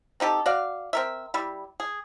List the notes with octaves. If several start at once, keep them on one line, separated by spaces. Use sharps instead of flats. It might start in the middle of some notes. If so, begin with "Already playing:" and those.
C4 D#4 G4 A4
F#4 D5 F5
C4 A#4 E5
G3 E4
G#4